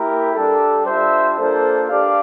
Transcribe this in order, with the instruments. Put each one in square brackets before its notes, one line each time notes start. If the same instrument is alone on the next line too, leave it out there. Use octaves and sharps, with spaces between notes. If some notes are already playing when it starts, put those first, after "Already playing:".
Already playing: [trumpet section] A#3 E4 G4 A#4
G3 D4 G4 A4
G3 D4 F4 C5 E5
A#3 D4 F4 A4 C5
D4 G4 D5 F5